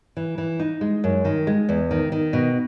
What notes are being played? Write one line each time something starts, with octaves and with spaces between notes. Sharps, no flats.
E3
E3
D#4
G#3
F#2
D#3
G#3
E2
D#3
D#3
B2